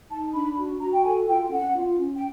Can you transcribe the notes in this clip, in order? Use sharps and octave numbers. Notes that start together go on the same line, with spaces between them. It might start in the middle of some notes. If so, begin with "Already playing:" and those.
D#4 A5
D4 B5
F#4
F#4 A#5
G5
A4 G#5
F4 G5
C#4 F#5
F4
C#4
G5